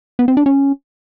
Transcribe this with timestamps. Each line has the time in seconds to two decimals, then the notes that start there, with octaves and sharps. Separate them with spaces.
0.19 B3
0.28 C4
0.37 D4
0.46 C#4